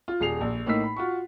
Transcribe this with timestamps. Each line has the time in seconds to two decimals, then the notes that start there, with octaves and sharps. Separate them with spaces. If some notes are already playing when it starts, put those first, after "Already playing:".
0.08 F4
0.20 D#1 G#4 C7 F7
0.41 A#1
0.66 A2 A#3 D#4 E6 B6
0.84 B5
0.97 F4 F#4 C#6